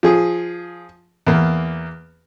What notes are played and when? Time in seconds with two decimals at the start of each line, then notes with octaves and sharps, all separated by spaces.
0.03 F3 G#4
1.27 E2 A#3